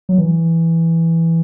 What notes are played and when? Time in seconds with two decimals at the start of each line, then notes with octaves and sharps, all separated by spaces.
0.09 F#3
0.18 E3